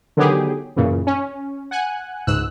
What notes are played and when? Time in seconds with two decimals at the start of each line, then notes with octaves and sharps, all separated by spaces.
0.17 D3 D#3 F#3 B3 G4 G#4
0.76 F#2 A#2 C#3 E3
1.07 C#4
1.71 F#5 G#5 F#6
2.27 C#2 G#2 E6 F#6